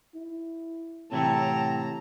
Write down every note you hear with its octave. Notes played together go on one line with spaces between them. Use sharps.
E4
A2 C3 E3 F#3 A3 C4 A5 A#5